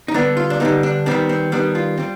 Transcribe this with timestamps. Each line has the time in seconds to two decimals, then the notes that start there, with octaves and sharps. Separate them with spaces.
0.08 D#4
0.14 D3 G3 B3 D4
0.37 F4
0.50 D4
0.60 D3 G3 B3 D#4
0.83 D4
1.06 D#3 G3 B3 C4
1.29 C4
1.52 D#3 G3 B3 D4
1.75 F4
1.98 G3 C4